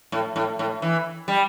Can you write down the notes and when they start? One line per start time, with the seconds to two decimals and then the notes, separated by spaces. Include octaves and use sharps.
0.12 A2
0.36 A2
0.59 A2
0.82 E3
1.28 G3